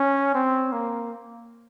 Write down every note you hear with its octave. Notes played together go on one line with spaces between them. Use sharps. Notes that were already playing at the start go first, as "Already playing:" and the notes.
Already playing: C#4
C4
A#3